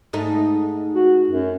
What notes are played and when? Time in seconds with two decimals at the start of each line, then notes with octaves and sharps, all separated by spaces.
0.13 G#2 A3 D#4
0.95 F#4
1.29 F#2